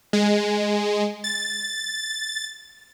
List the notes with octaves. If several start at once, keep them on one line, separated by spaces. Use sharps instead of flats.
G#3
A6